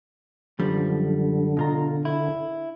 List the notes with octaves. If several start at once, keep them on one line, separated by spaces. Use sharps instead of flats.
F#2 D3 F3 G3
B2 F4 A#5
E4